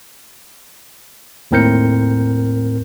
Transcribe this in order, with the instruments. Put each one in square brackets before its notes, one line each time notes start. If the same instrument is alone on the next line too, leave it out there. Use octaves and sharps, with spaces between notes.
[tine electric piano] D#2 A2 C4 A#4 G6 C#7